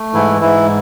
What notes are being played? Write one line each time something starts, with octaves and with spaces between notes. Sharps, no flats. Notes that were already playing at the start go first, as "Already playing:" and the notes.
Already playing: A3
G#2 E3 E4
G#2 E3 E4